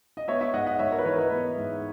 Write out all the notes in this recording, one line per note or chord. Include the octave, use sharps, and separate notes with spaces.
D#5
B3 C#5 E5
C#5 E5
G#2 D#5 F#5
D#5 F#5
G#2 C#5 E5
A#4 C#5
B4
E3 A#4 C#5
B4 D#5
B3
G#2